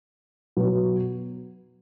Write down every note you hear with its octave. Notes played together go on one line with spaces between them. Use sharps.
B2 F#3 B3